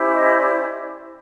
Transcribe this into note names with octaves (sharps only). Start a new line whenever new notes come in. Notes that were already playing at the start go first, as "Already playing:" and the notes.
Already playing: C#4 E4 G4 C5
D#5
D5